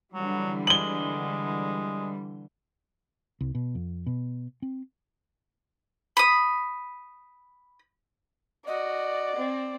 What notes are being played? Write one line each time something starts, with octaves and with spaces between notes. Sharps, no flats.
D3 E3 F#3 G3
G#3 F#7 G7
C2
B2
F2
B2
C4
B5 D#6
F#4 D5 D#5
C4